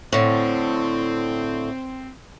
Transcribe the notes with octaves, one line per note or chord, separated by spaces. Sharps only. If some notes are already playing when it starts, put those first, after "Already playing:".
A2 D3 C4